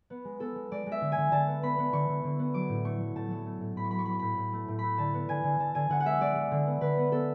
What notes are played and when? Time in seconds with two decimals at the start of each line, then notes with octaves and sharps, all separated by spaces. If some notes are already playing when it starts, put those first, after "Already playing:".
0.10 B3
0.25 G#3
0.40 B3 A4
0.55 G#3
0.71 G#3 D5
0.86 G#3
0.92 E5
1.01 D3
1.12 G#5
1.18 D3
1.32 D3 A5
1.47 B3
1.62 B3 B5
1.78 B3
1.93 D3 C#6
2.09 D3
2.24 D3
2.39 B3
2.54 F#3 D6
2.69 A2
2.85 A3 C#6
3.00 F#3
3.15 A2 A5
3.31 F#3
3.46 A3
3.61 A2
3.76 A2 B5
3.84 C#6
3.91 F#3 B5
3.99 C#6
4.05 F#3 B5
4.13 C#6
4.19 A2 B5
4.37 A2
4.53 A3
4.68 A2
4.79 A3 B5
4.98 D3 A5
5.14 B3
5.29 D3 G#5
5.44 D3
5.59 D3 A5
5.75 D3 G#5
5.89 D3 F#5
6.00 F#5
6.06 G#3 E5
6.21 G#3 D5
6.35 G#3
6.51 D3
6.66 B3
6.81 D3 B4
6.97 B3
7.12 B3 A4